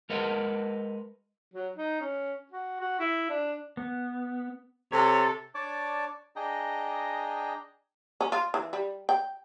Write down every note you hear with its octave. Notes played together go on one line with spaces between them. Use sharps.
G#3 A#4 B4 D#5 F#5
F#3
D#4
C#4
F#4
F#4
E4
D4
B3
C3 A4 C#5
D4 C#5 D5 A5 D6
D4 G#4 D#5 G5 A#5
C#4
F4
E3
G3
G5